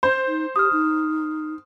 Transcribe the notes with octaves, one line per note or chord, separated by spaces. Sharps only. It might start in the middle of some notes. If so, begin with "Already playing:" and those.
C5
D#4
G4 D#6 F6
D#4